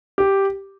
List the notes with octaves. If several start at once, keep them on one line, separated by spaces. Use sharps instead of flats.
G4